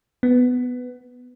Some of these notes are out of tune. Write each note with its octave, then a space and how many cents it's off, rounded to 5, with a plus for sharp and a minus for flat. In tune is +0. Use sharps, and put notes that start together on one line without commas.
B3 +10